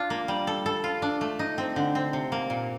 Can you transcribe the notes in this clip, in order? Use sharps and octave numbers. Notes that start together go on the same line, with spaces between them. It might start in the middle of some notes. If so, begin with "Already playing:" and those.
Already playing: D4 F4
A#3
G3
A4
A4
F4
D4
A3
D#4
C4
D3
C4
C3
A#3
A#2